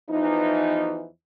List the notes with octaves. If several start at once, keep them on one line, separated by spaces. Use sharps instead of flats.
E2 E3 F3 D#4